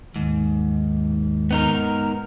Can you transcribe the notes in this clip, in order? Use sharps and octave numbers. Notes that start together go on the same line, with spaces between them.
D#2 G#2
B3 D#4 A#4